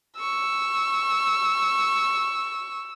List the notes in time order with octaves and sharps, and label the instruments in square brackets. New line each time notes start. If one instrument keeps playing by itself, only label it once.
[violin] C#6 [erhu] E6